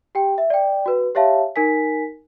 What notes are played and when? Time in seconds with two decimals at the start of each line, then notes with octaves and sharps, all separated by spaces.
0.15 G4 G5
0.38 E5
0.50 D5 G5
0.86 F#4 B4
1.15 G4 C#5 E5 F5 A5
1.56 D#4 A#4 G#5 B6